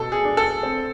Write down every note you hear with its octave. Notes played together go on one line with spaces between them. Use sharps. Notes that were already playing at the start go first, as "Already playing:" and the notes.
Already playing: B2 A4
G#4
D4
A4
C4